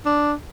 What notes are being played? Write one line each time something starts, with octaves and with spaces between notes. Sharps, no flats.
D4